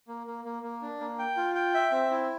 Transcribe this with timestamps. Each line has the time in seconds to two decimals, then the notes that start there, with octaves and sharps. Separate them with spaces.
0.08 A#3
0.27 A#3
0.45 A#3
0.63 A#3
0.82 D4
1.00 A#3
1.19 G5
1.37 F4
1.55 G5
1.74 E5
1.91 C4
2.11 E4